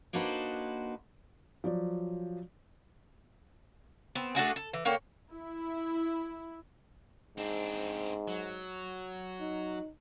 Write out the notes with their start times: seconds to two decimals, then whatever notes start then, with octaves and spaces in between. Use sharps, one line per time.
0.13 A#3 D4 D#4 F#4 B4 C5
1.64 F3 F#3 D5
4.15 B3 C4
4.35 A3 D4 F#4 G#4
4.56 A4
4.73 E3
4.85 D3 A#3 C#5 G5
5.32 E4
7.38 G#2 C4 D4
8.28 F#3
9.40 D#4